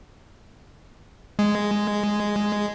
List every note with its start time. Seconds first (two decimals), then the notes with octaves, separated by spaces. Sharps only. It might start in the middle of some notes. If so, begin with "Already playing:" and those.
1.39 G#3